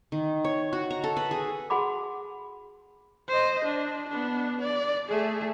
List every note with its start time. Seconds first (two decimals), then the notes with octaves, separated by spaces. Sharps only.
0.12 D#3
0.44 C#5
0.73 F#4
0.91 A#5
1.04 A4
1.17 B4
1.31 G#4
1.70 F#4 G#4 F#5 B5 D6
3.28 C5 D#5
3.65 D4
4.08 B3 D4
4.60 D5
5.09 A3 G#4